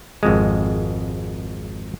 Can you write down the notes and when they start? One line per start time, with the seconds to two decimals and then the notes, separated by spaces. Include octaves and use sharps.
0.23 G#1 F2 G#3